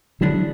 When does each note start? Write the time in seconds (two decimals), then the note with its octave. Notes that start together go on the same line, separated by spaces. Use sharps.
0.21 D3 E3 F#3 G#3 B3 D4